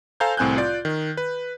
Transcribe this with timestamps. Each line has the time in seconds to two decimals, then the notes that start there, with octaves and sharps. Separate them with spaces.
0.20 A4 C5 F5 G#5 A#5 G6
0.37 C2 A2 C4 G#5 F#6 G6
0.57 F4 D5
0.85 D#3
1.17 B4